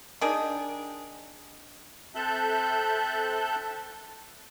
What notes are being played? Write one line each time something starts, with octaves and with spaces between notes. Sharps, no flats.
D#3 D4 G#4
C4 A4 E5 A5 F#6 G6